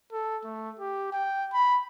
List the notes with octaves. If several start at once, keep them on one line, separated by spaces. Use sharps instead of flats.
A4
A3
G4
G5
B5